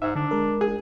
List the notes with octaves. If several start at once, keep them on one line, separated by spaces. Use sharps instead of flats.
G#2 E5
D3 D4
G#3 A#4
G#4